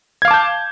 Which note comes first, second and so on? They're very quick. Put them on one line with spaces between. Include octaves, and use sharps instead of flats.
G#6 F5 D6 A5 G6